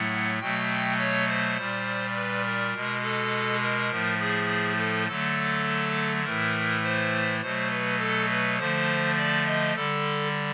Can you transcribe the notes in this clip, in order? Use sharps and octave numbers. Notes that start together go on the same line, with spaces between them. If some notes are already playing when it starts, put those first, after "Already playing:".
Already playing: A2 F#3 A3 F#5
B2 F#3 A3 G5
C#5
C5
A#2 G3
B4
A#4
B2 G#3
A4
A#4
A2 F3 A3
G#4
A4
D3 F#3 A3 A4
A2 E3 A3 A#4
C5
B2 F#3 A3 C5
B4
A4
B4
D3 F3 A3 C5
D5
D#5
D3 G3 A4